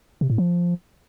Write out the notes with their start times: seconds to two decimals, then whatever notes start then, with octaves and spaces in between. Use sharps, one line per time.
0.21 C3
0.30 A2
0.38 F3